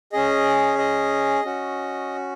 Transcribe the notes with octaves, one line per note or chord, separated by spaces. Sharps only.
C#4 G#4 D#5
D#5
C#4 F#4